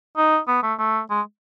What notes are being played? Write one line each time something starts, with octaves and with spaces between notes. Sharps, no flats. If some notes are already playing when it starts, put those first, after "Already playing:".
D#4
B3
A3
A3
G#3